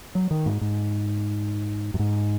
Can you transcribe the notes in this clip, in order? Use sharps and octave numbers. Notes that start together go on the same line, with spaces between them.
F#3
D#3
G#2
G#2
F#2
G#2